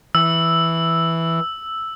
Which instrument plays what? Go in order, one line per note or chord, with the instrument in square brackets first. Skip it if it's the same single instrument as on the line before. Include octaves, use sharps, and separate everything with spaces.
[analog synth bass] E3 [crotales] E6